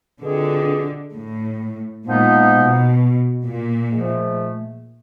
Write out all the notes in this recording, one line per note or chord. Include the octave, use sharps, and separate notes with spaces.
B2 D3 G#3 C4 F4 G#4
A2
A#2 F3 G#3 B3 D#4
B2
A#2
G#2 F3 A3